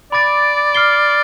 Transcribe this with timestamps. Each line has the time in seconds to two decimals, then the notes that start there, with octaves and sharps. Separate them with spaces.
0.12 D5 B5 D6 A6 D7
0.75 F6 C7 G7